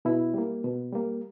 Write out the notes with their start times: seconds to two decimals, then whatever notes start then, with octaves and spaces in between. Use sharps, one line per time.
0.05 B2 E4
0.34 G3 A#3
0.64 B2
0.93 G3 A#3